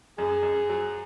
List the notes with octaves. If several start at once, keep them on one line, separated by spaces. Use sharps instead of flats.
F#2 G#4
F#2
F#3